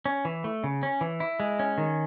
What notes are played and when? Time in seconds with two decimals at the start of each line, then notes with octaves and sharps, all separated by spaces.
0.06 C#4
0.25 E3
0.44 A3
0.64 C#3
0.83 C#4
1.01 E3
1.20 E4
1.40 G#3
1.59 C#4
1.78 D#3